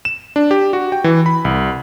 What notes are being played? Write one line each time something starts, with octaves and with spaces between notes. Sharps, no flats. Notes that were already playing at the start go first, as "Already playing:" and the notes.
E7
D4
G4
F#4
G5
E3
B5
C2